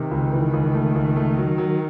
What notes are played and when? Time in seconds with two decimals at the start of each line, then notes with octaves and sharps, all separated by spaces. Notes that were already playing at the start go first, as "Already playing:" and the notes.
Already playing: C3 D#3
0.11 C#2
0.32 E3
0.54 C#2
0.74 A3
0.95 C#2
1.16 A3
1.37 F#3
1.58 F#3